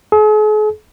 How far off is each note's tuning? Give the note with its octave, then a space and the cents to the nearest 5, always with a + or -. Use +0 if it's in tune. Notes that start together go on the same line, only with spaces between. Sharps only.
G#4 +45